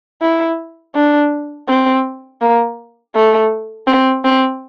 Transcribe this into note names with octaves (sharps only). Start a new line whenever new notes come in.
E4
D4
C4
A#3
A3
C4
C4